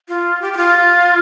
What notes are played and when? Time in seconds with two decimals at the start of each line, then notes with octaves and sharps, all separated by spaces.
0.08 F4
0.42 G4
0.53 G4
0.57 F4